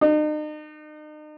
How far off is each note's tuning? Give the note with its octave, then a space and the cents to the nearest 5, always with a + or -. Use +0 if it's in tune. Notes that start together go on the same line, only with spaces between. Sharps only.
D#4 -40